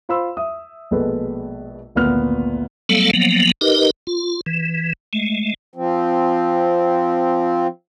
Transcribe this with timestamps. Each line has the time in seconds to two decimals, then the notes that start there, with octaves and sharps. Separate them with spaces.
0.09 F4 C5 B5 C6 E6
0.37 E5 D#6
0.91 A#1 B2 G#3 A4 B4
1.95 G#1 D2 A#2 B3 F6
2.89 F#3 G3 A3 B3 A4 F5
3.13 F3 F#3 A#3 B3
3.61 D#4 G4 A#4 B4 D#5
4.07 F4
4.46 E3
5.13 G#3 A3
5.75 F3 C4